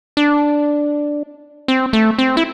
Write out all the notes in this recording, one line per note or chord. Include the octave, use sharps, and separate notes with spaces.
D4
C4
A3
C4
E4